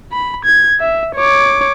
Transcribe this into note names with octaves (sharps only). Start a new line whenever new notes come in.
B5
G#6
E5
C#5 D6